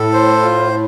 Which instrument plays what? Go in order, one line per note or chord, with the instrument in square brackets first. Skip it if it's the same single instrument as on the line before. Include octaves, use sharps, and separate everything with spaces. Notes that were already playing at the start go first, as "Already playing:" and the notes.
Already playing: [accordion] A2 [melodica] A4
[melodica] C5
F4